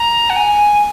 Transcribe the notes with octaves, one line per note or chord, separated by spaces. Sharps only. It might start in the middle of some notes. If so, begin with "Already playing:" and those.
Already playing: A#5
F#5
G#5